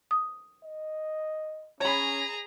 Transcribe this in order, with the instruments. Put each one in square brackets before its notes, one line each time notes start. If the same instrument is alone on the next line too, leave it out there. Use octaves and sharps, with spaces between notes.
[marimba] D#6
[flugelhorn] D#5
[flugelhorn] C#4 [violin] G#4 A#5 [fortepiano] C#5 B5